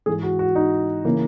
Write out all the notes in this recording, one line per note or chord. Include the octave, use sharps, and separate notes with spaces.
G#2 E3 G#4
F#4
F#4
D#4
C#3 E3 A#3